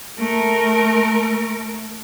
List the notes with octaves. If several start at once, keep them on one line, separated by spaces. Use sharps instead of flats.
A3 A#4